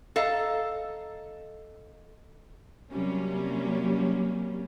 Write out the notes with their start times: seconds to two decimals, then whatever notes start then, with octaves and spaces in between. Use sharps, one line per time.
0.16 A4 D#5 F5 A#5
2.91 C3 F#3 G3 A#3 C#4